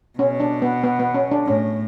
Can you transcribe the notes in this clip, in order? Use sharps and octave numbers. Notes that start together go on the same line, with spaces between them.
B2 C#4
D4
B3
B3
B3
C#4
D4
A2 C#4